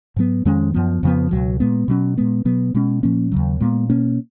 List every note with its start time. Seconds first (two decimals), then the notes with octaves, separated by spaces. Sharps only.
0.16 G#2 F#3 B3
0.45 F2 D#3 G#3 C#4
0.74 F#2 F3 B3
1.03 F2 C#3 F3 B3
1.31 C#2 B2 F#3
1.60 A#2 G#3 B3
1.88 B2 F#3 C#4
2.18 A#2 G#3 B3
2.45 B2 F#3 B3
2.74 B2 G#3 C#4
3.03 A#2 F3 A#3 C#4
3.32 D#2 C#3 F#3
3.60 A#2 G#3 B3
3.90 B2 A#3 C#4